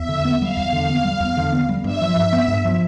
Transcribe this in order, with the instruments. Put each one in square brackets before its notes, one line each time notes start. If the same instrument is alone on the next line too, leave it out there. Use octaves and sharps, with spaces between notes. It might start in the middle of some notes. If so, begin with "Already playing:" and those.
Already playing: [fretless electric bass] E2 [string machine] E5
[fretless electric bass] D3
B3
[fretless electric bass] G3 [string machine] F5
[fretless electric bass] E2
D3
B3
G3
E2
D3
B3
G3
[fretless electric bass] G2 [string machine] E5
[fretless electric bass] F3
G2
B3
G2
F3